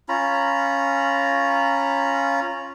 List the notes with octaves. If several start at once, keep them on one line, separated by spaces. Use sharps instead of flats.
C#4 F4 A#5 B5